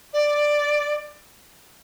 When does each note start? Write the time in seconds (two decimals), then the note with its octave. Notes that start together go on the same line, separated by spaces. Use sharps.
0.13 D5